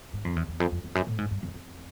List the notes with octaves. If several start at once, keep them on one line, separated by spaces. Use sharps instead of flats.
G#2
F2
E2
E2
F2
F2
F2
F#2
A2
G#2
G2
F2
F2